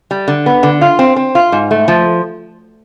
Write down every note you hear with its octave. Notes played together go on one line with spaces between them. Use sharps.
G3
D3
B3
D3
F4
C4
C4
F4
G#2
A3
F3